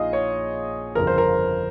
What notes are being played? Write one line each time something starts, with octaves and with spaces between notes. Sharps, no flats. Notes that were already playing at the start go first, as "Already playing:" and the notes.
Already playing: A#1 A#2 F3 D#4 F4 G#4 D#5 F5
C#5
G1 F2 C#3 F3 A#4
C5
A#4